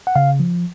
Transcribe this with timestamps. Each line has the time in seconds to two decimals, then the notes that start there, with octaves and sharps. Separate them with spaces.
0.07 F#5
0.16 C#3 F5
0.40 F3